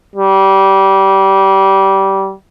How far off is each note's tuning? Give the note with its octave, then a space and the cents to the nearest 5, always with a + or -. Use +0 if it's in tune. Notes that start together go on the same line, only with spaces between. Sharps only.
G3 -20